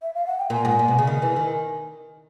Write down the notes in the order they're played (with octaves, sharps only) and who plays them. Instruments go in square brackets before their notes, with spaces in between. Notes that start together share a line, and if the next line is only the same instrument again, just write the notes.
[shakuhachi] E5
F5
F#5
G5
[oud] A#2 [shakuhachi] G#5
[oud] G#2
A#2
B2
C#3
D#3
E3
D#3